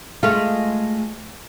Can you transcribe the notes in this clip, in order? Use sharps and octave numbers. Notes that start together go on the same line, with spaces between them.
G#3 A3 F4